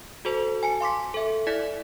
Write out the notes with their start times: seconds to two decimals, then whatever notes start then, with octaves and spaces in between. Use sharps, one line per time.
0.25 F#4 A4 C5 A5
0.63 G#5 A5 C#7
0.80 F5 C6 D6 B6
1.14 A4 E5
1.47 E4 D5 G#6 B6